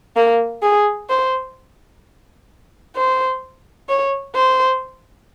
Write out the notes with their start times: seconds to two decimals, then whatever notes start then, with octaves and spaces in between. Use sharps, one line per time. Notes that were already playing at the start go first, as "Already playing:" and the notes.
0.16 A#3
0.62 G#4
1.09 C5
2.96 C5
3.89 C#5
4.35 C5